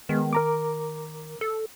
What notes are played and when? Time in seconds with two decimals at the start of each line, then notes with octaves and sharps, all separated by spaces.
0.09 D#3 G#3 B3
0.33 A#4 A#5 D6
1.41 A4